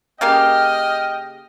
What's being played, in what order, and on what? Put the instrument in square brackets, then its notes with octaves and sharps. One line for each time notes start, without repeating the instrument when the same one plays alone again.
[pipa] C#3 A#3 G4 [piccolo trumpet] D#5 [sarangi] G5 [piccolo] F6